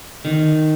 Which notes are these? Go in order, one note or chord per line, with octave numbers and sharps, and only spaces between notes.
D#3